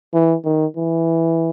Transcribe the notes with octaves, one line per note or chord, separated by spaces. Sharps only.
E3
D#3
E3